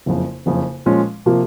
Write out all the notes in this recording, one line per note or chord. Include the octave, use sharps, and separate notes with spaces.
F#1 F2 C#3
F#1 F2 C#3
A#2 F3 G#3 C#4 F4
C3 F3 A#3 F4